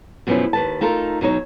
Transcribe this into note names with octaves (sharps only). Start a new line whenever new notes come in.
F#2 B2 F3 A3 C#4 E4
D#2 B4 A5
A3 D#4 F4 A4 A#4
B2 F#3 D#4 C#5